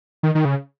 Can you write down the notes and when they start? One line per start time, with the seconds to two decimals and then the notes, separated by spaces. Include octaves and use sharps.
0.23 D#3
0.35 D#3
0.45 C#3